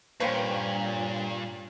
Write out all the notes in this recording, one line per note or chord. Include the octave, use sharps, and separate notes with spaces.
G2 A#2 A#3 C#4 B4 C5 G5 C#6